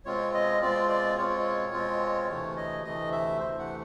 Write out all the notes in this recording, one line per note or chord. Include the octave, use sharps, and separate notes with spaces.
B2 G#3 C4 F4 C#5
D#5
B2 G#3 C4 F4 D5
D5
B2 G#3 C4 F4 C#5
B2 G#3 C4 F4
D2 C3 E3 A3 C#5
D#5
D2 C3 E3 A3 D#5
E5
D2 C3 E3 A3 C5
F#5